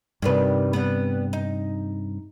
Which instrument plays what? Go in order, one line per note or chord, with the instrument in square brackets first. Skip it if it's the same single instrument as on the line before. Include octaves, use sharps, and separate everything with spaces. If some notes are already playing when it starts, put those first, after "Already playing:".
[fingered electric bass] G2 C3 [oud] D#3 G3 B4
[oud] G3 B3
D#4